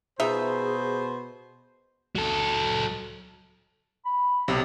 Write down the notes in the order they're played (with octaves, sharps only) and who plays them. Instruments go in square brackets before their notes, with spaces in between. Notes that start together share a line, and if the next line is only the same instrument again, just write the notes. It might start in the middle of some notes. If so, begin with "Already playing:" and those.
[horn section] B2 C5 [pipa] D#4 F4 E5 [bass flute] G#4
[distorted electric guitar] F#3 A4
[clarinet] B5
[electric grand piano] B1 C3